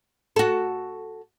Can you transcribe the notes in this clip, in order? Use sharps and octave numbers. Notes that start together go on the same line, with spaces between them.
F#4 A4